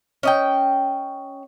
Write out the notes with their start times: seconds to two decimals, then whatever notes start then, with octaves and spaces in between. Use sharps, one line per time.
0.23 C#4 D#5 G5